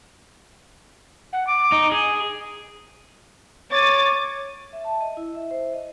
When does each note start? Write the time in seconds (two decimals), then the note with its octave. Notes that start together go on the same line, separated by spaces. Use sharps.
1.33 F#5
1.47 D6
1.72 D#4
1.92 G#4 G#5
3.72 C#5 D6 A6 D#7
4.73 E5
4.84 A5
5.01 D#5
5.17 E4
5.35 E5
5.51 C5
5.73 D#5